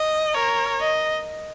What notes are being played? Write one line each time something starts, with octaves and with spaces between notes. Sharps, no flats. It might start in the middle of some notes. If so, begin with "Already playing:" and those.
Already playing: D#5
A#4 C#5
D#5